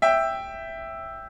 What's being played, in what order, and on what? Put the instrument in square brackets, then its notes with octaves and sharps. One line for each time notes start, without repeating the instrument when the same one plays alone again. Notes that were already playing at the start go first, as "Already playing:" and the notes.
[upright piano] E5 G5